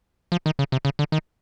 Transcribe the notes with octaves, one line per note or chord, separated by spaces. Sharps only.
F3
D#3
C#3
C3
C#3
D3
D#3